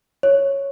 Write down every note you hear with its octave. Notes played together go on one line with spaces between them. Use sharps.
C#5